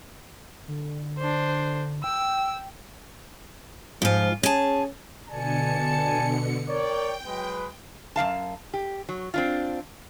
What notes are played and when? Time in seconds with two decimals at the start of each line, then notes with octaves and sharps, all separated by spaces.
0.68 D3
1.19 D4 C5
2.04 G5 E6
4.02 G#2 F3 F4
4.43 C#4 G#4 A5
5.29 B2 D3 D5 G#5 A5 C#7
6.68 A#4 C#5 D5 G5
7.26 F#3 G#3 B4
8.16 F#2 B3 F5 A5
8.73 G4
9.09 F#3
9.34 C4 D4 F4